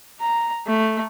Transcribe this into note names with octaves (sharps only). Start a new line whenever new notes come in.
A#5
A3